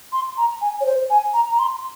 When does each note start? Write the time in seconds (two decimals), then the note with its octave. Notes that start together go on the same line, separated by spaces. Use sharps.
0.12 C6
0.38 A#5
0.62 G#5
0.81 C#5
0.86 C5
1.10 G#5
1.34 A#5
1.51 A#5
1.59 C6